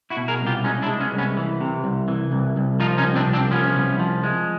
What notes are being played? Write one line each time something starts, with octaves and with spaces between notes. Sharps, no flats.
E4 F#4
B2
G#4 A#4
C2
F4 G4
G#3 C#4 D#4
D4 E4
G#3
B3 C#4
C2
B3 C#4
E3
C3
C2
E3
C2
C2
F3 D#4 F4
C#4 D#4
C2
C4 D4
C2
C4 D4
F3 B3 C#4
C2
F3
G#3